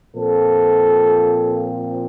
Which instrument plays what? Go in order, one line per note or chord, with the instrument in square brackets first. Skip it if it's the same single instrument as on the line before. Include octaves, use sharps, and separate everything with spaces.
[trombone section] A#2 F3 C4 A4